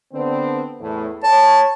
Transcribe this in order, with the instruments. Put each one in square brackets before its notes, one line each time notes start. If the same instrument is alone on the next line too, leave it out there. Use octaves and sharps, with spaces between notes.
[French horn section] D3 B3 C4
E2 A2
[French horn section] C#5 [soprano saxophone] A5